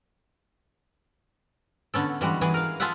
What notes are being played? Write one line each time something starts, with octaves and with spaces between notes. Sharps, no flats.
D3 B3 C#4 A4
E3 G3 G#3 F#4
E3 B3 G#4
A#4 F5
F4 G#4 A4 E5 F#5